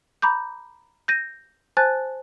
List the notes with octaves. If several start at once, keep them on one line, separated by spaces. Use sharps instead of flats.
A#5 B5 D6 G6
G6 A#6 D#7
C5 G#5 A5 F#6 A6